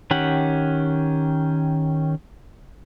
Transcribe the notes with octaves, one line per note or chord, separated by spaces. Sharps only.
D#3 C#4 G4 F#5